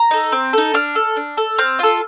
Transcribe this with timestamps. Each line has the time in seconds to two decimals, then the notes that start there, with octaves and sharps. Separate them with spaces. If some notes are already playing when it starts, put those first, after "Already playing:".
Already playing: A#5
0.11 D#4 A4
0.32 C4
0.53 D#4 A4
0.74 D4 F6
0.95 A4
1.16 D4
1.37 A4
1.58 C4 F6
1.79 F4 A4